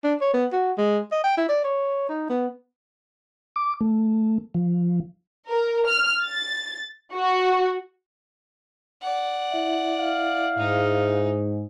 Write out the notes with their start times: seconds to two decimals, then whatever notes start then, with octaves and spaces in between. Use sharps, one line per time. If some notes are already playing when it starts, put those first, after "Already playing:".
0.04 D4
0.21 C#5
0.34 B3
0.53 F#4
0.78 G#3
1.12 D#5
1.24 G5
1.37 E4
1.49 D5
1.64 C#5
2.09 D#4
2.30 B3
3.56 D6
3.81 A3
4.54 F3
5.48 A#4
5.86 F6
6.24 A6
7.13 F#4
9.02 D5 F#5
9.51 E4 E5
9.97 F5
10.57 G#2 D#4